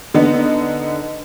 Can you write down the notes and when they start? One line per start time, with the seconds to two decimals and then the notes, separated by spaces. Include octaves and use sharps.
0.14 D3 B3 D#4